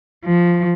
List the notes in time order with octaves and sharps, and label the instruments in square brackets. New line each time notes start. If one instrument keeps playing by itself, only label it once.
[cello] F3